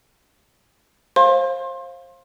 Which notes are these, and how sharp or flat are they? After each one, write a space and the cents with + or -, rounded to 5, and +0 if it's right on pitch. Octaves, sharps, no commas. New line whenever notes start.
C5 +30 F5 +0 C6 +30